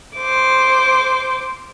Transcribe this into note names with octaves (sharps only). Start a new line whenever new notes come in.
C5 D6